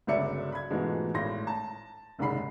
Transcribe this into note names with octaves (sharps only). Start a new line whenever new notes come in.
G1 C#2 F#3 D5 E5 C#7
B5 G#6
G#2 B2 E3 F3 G#3 A3
G#1 A2 C6 A#6
A5
F#1 C2 G#2 D#3 B5 C7